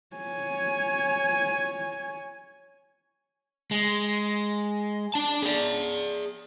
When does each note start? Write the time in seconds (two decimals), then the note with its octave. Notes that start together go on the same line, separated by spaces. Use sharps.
0.16 C#5 G#5
3.71 G#3
5.14 D4 A5
5.42 G#4 D5